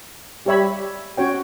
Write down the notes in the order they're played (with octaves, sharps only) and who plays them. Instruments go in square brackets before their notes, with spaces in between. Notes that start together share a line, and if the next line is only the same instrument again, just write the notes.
[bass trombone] G3 [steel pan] G4 C#5 E5 B5
[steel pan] C#4 F#4 C#5 G5